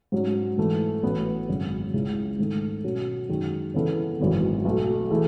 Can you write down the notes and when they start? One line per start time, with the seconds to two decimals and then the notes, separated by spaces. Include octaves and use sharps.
0.12 G#2 F#3 C#4
0.57 G#2 E3 A3
1.03 A1 A2 F#3 B3
1.48 G#1 F#2 C#3 F#3 C#4
1.93 C#2 C#3 G#3 C#4 E4
2.39 G#2 D#3 A3
2.84 B2 F#3 C#4
3.29 F#2 D#3 G#3
3.74 C#3 E3 B3 E4 A4
4.20 G#1 F#2 C#3 E3 B3
4.65 B1 B2 A3
5.10 E3 A3 E4 G#4